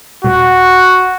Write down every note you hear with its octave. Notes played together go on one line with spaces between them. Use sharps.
D#1 F#4